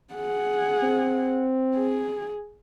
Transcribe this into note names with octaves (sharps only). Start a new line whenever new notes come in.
G#4 F#5
C4
G#4